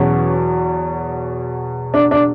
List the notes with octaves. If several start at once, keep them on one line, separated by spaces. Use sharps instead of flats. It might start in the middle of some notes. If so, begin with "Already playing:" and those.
Already playing: E2 B2 F#3 C#4
D4
D4